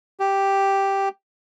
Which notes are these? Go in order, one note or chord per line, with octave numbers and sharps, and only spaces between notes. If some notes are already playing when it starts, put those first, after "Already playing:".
G4